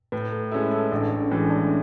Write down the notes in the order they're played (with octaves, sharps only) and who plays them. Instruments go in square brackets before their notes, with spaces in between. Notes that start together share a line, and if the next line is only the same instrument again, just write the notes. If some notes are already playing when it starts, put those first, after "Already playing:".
[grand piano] A2 [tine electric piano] B4
[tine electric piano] A4
[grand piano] G#3 C#4 E4 [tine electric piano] A4
[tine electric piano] A4
[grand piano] A1 [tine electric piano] D4
[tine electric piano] C#4
[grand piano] A2 E3 G#3 [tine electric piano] C#4
[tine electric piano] D4